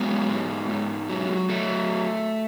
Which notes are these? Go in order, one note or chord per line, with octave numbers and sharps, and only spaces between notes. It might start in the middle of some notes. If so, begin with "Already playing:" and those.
Already playing: F#3 G#3 B3
G#2
G#2
F#3
F#3 A3